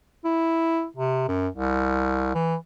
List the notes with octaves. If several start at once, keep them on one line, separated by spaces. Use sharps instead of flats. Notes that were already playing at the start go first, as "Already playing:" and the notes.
E4
C3
F#2
C2
E3